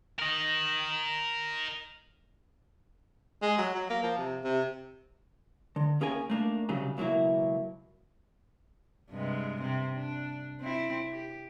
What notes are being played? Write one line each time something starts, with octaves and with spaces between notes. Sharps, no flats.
A#4 D#5
G#3
F#3
F#3
A#3
F3
C3
C3
D3
A#3 C#4 G#4 A#4 E5 G#5
A3 A#3 D4
C2 C#3 F#3 G#4
C#2 B2 F#3 A#3 E4
G2 C3 G#3
C3 C4
D4
C4 E4
G4